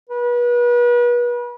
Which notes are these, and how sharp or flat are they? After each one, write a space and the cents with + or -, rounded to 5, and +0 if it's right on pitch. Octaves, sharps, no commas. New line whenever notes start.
B4 -35